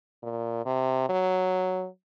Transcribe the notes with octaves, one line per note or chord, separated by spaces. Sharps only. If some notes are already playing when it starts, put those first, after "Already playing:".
A#2
C3
F#3